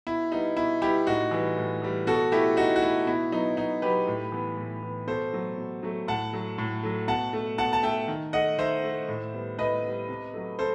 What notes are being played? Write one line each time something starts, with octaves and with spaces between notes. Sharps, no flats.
B2 E4
G3 B3 D#4
B2 E4
G3 B3 E4 G4
A2 D#4 F#4
E3 G3
A2
E3 G3
B2 F#4 A4
A3 E4 G4
B2 D#4 F#4
F#4
A3 E4
B2 E4
F#3 B3 D#4
B2 D#4
F#3 B3 G4 B4
A2
E3 B3
A2
E3 B3
B2 A4 C5
F#3 A3
B2
F#3 A3
A2 F#5 A5
F#3 A3
A2
F#3 A3
B2 F#5 A5
A3
B2 F#5 A5
A5
A3 E5 G5
D#3
A3 D#5 F#5
D#3 C5 E5
A3
A2
G3 B3
A2 B4 D#5
G3 B3
C3
F#3 A3
C3 A4 C5